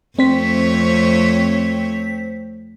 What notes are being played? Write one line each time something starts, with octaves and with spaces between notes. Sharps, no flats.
F2 A3 C4 C5 C#5 B6